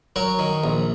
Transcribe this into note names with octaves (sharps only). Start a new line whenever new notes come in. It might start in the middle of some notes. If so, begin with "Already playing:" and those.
F#3 A#4 C#5
D#3
A#1